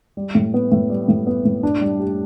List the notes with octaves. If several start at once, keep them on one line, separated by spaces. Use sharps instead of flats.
G3
A2
B3
A2
G3
A2
B3
A2
D4
G3
G4